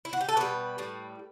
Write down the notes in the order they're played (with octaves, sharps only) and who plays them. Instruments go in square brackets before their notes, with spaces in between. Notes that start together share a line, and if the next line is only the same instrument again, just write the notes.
[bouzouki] E4
F#4
G4
A4
B2 G3 B4
A2 G3